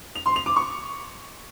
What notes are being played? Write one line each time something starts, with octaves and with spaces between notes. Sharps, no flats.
F7
C6
F7
D6
C#6